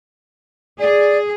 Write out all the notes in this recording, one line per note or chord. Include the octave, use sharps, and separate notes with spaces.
G#4 D5